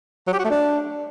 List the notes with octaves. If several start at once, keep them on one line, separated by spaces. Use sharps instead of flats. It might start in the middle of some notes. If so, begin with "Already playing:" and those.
F#3
G4
F#4
A3
D4